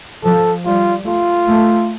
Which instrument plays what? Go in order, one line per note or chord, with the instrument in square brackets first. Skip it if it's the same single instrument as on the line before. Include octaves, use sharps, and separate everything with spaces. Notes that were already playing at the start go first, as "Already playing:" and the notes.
[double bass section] F3 [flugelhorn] A4
[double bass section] G3 [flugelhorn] F4
[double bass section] A3 [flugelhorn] F4
[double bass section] A3